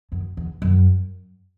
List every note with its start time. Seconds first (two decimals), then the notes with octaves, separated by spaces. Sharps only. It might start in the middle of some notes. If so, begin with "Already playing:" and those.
0.12 F#2
0.37 E2
0.62 F#2